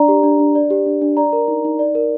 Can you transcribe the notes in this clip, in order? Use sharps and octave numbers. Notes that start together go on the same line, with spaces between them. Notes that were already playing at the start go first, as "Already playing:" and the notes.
Already playing: D4 D5 A#5
G4
D4
D4
D5
G4
D4
D4
D5 A#5
A#4
D#4
D#4
D5
A#4